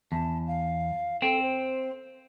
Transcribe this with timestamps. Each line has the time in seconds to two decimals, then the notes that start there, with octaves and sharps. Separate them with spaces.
0.12 E2 A5
0.47 F5
1.22 C4 A4
1.42 C5